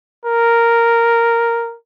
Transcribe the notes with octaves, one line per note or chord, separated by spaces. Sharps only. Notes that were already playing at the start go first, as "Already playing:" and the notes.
A#4